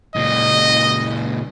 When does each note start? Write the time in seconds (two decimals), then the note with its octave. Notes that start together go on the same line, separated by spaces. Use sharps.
0.16 C#2 A#2 D#5